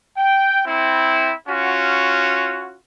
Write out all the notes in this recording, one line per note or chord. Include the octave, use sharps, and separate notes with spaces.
G5
C4 E4
C#4 F4 F#4